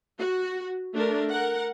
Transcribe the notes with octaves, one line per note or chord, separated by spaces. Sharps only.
F#4
A3 D4 A#4
A#4 F#5